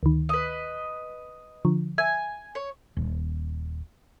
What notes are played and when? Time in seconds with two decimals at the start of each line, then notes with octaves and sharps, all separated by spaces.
0.03 D2 D#3
0.29 B4 D#5
1.65 D3 F3
1.98 E5 G#5
2.55 C#5
2.97 D#1